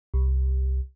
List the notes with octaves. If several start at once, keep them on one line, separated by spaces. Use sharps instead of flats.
C2